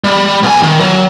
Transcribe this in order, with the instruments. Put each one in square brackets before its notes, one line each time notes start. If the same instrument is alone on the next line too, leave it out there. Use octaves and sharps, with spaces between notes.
[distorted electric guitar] G3
B1 G#5
D#3
F#3